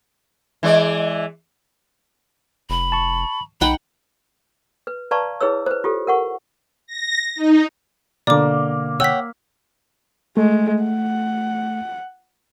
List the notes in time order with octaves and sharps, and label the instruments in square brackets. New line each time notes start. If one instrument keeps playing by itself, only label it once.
[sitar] E3 G#3 D5
[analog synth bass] F1 [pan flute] B5
[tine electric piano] A5 C#6
[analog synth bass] B1 [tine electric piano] D#4 [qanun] F#5 G5 [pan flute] B5
[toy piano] B4
B4 D5 F5 A5 A#5 C#6
E4 G#4 B4 C#5 E6
B4 C5
F4 G4 A4
A#4 F#5 C#6
[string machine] A#6
D#4
[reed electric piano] B2 D3 [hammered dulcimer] A#3 [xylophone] D5 D6
[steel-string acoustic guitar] C#5 F#5 G5 [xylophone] E6 B6
[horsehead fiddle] G#3 [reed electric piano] A3
[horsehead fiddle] F#5